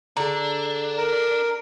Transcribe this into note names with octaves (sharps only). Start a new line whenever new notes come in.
D3 D4 G#4 A#5
A#4